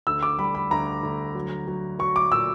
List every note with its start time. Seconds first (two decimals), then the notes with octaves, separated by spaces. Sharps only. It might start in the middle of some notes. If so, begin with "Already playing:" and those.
0.07 D2 E6
0.23 D6
0.39 G3 B5
0.55 B5
0.71 D2 A#5
1.03 D2
1.35 F#3
1.68 F#3
1.99 F#3 C#6
2.16 D6
2.31 A#2 E6